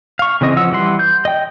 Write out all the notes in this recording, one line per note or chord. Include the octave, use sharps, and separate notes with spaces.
F5 C#6
C#3 E3 C4 D#5
F3 F#5 E6
E3 G3 F#5 C6
G6
D#5 G5